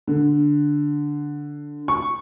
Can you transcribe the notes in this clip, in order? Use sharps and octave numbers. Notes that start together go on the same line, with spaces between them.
D3
C#6